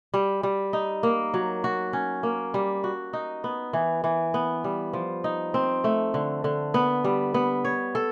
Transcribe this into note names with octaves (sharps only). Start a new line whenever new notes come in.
G3
G3
D#4
A#3
F#3
F#4
C#4
A#3
G3
F#4
D#4
B3
E3
E3
B3
G3
F3
D#4
C4
A3
D3
D3
B3
G3
B3
C#5
A4